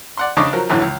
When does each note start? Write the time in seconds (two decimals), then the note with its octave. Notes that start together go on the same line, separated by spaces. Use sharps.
0.17 D5 F#5 C6
0.37 G#1 C#3 D4 D#5 C#6 D6
0.53 F3 F#3 A#4
0.70 F#2 A2 D3 E3
0.82 C#2